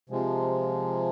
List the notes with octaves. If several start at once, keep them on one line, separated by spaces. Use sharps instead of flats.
C3 F3 G#3